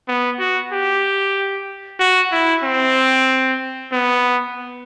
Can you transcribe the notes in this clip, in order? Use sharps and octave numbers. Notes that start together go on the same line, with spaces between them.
B3
F#4
G4
F#4
E4
C4
B3